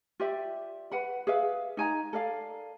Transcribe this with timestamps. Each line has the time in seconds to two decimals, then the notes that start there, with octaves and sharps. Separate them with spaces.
0.20 F4 G4 D5 E5
0.91 B4 F#5 B5
1.27 G#4 B4 E5 F5
1.77 D#4 G#5 A#5
2.13 A4 A#4 D5 F5